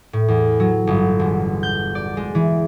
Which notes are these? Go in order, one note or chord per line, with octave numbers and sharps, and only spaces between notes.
A2
E2
F#3
G1
E1
G6
D5
G#3
E3